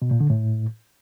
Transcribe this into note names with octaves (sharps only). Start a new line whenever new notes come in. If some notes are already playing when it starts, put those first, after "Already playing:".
B2
A#2
D3
A2